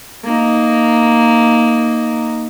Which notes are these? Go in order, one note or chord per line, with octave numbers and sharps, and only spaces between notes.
A#3 D#4